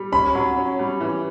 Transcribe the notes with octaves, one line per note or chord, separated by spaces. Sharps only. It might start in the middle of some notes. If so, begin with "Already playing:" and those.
Already playing: G3
C#4 B5
F#3
C#4
G3
E3